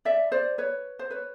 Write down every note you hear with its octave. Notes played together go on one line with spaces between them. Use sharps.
D5 E5
C5 D5
B4 C#5
C5
B4 C#5